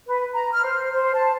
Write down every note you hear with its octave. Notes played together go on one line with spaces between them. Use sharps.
B4
A#5
F6
C5
C5
A5